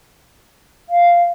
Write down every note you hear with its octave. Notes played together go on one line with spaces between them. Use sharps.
F5